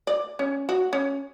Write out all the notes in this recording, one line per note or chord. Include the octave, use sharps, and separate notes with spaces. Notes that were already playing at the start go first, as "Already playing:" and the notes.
D5
C#4
F#4
C#4